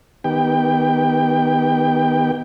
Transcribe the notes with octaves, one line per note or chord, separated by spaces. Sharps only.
D#3 B3 G4 G5